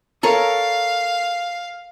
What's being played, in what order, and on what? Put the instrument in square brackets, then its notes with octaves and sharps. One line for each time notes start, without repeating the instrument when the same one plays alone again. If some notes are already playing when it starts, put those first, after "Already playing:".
[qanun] A4 A#4 C#5 [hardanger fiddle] F5